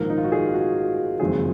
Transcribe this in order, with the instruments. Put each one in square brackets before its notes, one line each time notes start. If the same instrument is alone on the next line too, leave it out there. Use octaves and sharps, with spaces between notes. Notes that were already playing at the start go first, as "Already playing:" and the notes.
Already playing: [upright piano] A#1 G#2 D#3 A#3 [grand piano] A#4
[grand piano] D#4
F4
F#4
G#4
F4
F#4
[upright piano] F#1 F2 D#3 G#3 C4 [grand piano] G#4